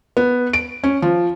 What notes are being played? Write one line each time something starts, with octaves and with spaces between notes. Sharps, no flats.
B3
D7
C#4
F3